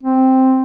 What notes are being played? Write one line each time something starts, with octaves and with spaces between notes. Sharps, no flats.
C4